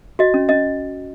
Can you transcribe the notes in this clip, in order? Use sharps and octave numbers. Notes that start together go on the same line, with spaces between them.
F#4 D#5
C#4
C#4 D#5